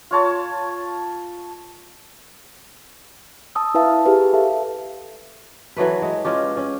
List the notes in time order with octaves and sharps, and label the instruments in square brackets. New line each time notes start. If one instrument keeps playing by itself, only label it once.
[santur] F4 C#5 A5
[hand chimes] A5 D#6 E6
E4 B4 E5 F5 A5
G4 G#4 B4
A4 E5 F5 A5
[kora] E3 F#3 A3 B4
G#3
G#3 C#4 F4 G4
C#4